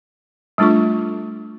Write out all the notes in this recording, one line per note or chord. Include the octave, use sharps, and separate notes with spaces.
G3 A3 D4 F4 A4 C#6